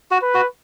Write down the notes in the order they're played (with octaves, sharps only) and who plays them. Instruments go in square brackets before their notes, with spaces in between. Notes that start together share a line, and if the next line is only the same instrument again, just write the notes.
[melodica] F#4
[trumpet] B4
[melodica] F#4